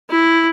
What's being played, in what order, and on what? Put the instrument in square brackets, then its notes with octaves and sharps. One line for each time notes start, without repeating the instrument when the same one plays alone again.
[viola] E4